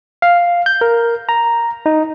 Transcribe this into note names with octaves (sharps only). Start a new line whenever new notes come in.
F5
G6
A#4
A#5
D#4